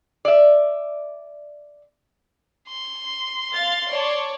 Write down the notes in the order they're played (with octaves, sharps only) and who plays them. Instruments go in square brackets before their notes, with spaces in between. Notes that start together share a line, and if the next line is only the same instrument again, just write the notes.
[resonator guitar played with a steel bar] D5 E5
[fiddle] C6
[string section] F5 A6
C#5 D5 A5